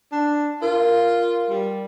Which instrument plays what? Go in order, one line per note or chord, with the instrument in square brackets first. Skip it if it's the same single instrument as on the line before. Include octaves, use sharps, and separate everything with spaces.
[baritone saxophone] D4
[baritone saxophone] F4 [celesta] A#4
[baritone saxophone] G3